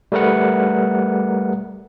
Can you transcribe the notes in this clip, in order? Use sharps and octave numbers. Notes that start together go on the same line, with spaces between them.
G3 A3 A#4 B4 F#5